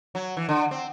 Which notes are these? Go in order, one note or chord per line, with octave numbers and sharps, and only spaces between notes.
F#3
E3
D3
C4